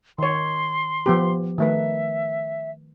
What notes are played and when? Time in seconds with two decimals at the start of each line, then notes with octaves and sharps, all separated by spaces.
0.18 D#3 C#5 C6
1.06 F3 B3 G4
1.58 D#3 A3 B4 E5